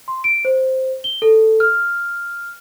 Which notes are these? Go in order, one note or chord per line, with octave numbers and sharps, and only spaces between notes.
C6
D7
C5
G7
A4
F6